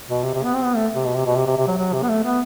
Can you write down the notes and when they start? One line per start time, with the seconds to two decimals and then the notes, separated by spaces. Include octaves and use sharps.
0.08 B2
0.23 C3
0.34 C3
0.44 B3
0.54 C4
0.64 B3
0.75 A3
0.95 C3
1.06 B2
1.15 C3
1.26 B2
1.36 C3
1.47 C3
1.57 C3
1.67 F#3
1.77 F#3
1.93 C3
2.03 B3
2.08 A3
2.24 B3